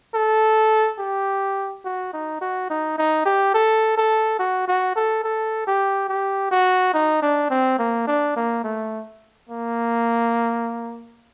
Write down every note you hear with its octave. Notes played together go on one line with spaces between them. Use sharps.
A4
G4
F#4
D#4
F#4
D#4
D#4
G4
A4
A4
F#4
F#4
A4
A4
G4
G4
F#4
D#4
D4
C4
A#3
D4
A#3
A3
A#3